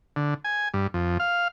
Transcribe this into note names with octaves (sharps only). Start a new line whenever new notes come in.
D3
G#5
G2
F2
F5